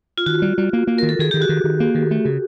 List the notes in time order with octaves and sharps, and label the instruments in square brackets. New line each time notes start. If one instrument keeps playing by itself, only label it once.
[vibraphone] F4
[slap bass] D#3 [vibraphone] F#4
[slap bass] G3
G3
A#3
A#3
[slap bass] D#3 [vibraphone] A#4
[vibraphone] A4
[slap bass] D#3 [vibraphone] G#4
[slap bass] D#3 [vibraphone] G4
[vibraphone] F#4
[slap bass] D#3
D#3
A#3
D#3
A3
C#3